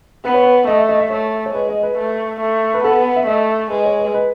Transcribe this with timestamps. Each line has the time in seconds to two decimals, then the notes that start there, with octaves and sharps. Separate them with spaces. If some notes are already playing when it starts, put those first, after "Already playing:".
0.25 B3 B4
0.34 C#5
0.44 B4
0.67 A3 D#5
0.78 E5
0.89 D#5
1.00 E5
1.10 A3 C#5
1.46 C#5
1.53 G#3 B4
1.69 D#5
1.83 B4
1.97 A3
2.40 A3
2.74 B4
2.83 B3 A4
3.16 E5
3.26 A3 D#5
3.70 G#3 B4
3.85 C#5
3.99 B4
4.14 B4